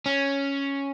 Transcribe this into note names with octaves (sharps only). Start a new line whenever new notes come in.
C#4